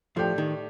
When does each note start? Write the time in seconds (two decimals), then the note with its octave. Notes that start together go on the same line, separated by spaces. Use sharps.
0.16 A2 F3 A3 D4 G4
0.38 D#3